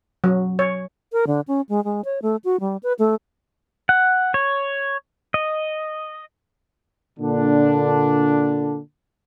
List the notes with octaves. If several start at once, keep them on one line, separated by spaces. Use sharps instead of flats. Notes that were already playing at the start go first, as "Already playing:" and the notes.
F#3
C#5
A#4
D3
C#4
G#3
G#3
C#5
A3
F#4
G3
B4
A3
F#5
C#5
D#5
A#2 D3 D4